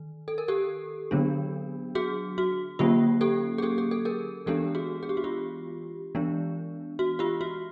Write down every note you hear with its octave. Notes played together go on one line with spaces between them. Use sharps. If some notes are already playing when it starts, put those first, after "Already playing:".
Already playing: D#3
A4
A#4
G4 A4
D3 F#3 B3 D4
F#4 G#4
F#4
D3 F#3 A#3 C#4 F4 G4
G4 A4
G#4
G4 A4
G#4
A4
G#4 A#4
E3 G#3 B3 D4 G4 A4
F#4 G#4
G#4
G4
F#4
F4 G4
E3 G#3 B3 D4
F#4
F4 G4
F#4